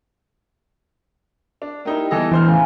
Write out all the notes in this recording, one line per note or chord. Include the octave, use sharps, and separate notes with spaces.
D4
A#3 D#4 E4 G4 D#5 G5
E3 G3 B3 A4 D#5
D2 E3 C5 F6
A2 C#3 A3 F5 G#5 B5